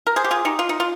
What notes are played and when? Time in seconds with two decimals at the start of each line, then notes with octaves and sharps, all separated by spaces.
0.07 A#4
0.16 G#4 C5
0.24 G4
0.31 F4 G#4
0.45 D#4 G4
0.59 F4
0.69 D#4
0.80 F4